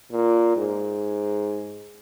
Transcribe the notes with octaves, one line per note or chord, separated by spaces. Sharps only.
A#2
G#2